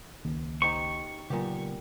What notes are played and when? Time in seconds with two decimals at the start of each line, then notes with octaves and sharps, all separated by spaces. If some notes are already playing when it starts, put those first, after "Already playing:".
0.25 C#2 D#3 A#3
0.62 D#4 G4 C5 C#6
1.30 A#2 C#3 F#3 B3 G4